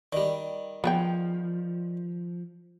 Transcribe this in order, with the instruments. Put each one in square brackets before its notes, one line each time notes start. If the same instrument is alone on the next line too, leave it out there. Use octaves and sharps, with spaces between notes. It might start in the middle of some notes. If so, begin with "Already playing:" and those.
[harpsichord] D#3 G3 [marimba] D5
[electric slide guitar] F3 [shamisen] B3 G#4 G5